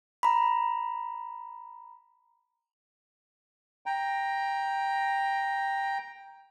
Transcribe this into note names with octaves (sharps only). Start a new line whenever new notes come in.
A#5 B5
G5 A#5